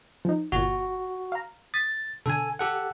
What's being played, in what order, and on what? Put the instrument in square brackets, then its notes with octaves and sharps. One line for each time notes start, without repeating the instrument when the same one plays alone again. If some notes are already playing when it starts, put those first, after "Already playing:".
[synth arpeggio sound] F3 D#4
[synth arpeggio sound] G1 A#2 [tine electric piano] F#4
[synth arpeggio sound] F5 A#5
[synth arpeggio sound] D#6 B6 [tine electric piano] A6
[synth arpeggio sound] B2 D3 [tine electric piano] A4 G#5
[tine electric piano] G4 A4 F#5